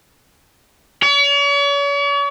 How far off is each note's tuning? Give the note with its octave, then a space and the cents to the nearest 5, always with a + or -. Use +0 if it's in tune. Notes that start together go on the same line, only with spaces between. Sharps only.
C#5 +40